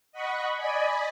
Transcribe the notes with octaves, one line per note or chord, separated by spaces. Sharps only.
D#5 F#5 B5 C#6
D5 D#5 G#5 B5